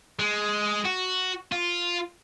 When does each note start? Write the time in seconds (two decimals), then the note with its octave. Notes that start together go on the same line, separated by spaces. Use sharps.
0.19 G#3
0.85 F#4
1.52 F4